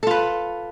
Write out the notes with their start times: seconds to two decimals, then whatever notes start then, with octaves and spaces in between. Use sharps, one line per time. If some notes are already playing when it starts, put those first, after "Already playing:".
0.03 A4
0.07 F4
0.11 B4